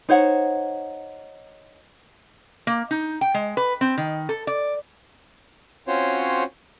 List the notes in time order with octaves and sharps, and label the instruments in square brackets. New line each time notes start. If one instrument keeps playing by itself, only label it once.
[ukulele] D#4 C5 C#5 F#5
[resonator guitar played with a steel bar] A#3
D#4
G5
G#3
B4
C4
D#3
A4
D5
[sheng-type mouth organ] C4 C#4 F4 F#4 C5 C#5